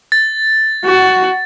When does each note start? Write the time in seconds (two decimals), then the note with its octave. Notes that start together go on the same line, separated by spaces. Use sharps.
0.12 A6
0.85 F#4